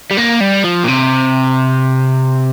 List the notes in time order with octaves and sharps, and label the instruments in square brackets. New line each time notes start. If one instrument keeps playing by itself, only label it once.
[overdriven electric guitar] G3
A#3
G3
F3
A#2
C3